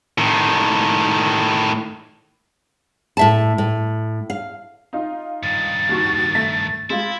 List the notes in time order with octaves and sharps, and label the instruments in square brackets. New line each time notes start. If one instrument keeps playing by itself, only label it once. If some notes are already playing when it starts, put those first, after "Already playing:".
[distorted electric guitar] A2 D#3
[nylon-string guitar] A2 E5 A5
A2
F5
[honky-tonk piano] D#4 F4
[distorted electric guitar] G2 D#3 [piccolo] A6
[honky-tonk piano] D#2 F#4 C#6
A3 B6
[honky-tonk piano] G#3 F4 [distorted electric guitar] E4